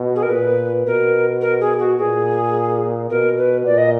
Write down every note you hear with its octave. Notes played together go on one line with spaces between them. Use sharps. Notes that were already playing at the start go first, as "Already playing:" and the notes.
Already playing: B2
G#4
A#4
A#2 B4
B2 A#4
A#4
G#4
F#4
A#2 G#4
B2 A#4
B4
A#2 D5
D#5